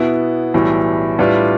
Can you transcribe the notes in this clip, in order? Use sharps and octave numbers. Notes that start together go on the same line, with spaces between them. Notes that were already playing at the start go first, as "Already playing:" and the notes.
Already playing: B2 B3 E4
B1 A2 E3 G3
A2 G3 D4 F4 B4